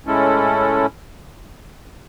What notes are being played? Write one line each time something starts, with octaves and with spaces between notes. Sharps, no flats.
A2 G#3 C#4 E4 A4